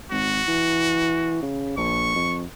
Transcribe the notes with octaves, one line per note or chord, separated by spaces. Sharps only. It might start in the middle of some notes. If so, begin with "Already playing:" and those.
G#1 F#4
E3
C#3
A#1 C#6
F2